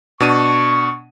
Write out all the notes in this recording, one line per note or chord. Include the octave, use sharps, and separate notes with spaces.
B2 D4 C#6 D#7